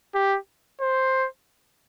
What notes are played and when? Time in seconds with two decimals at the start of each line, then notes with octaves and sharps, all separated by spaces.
0.15 G4
0.81 C5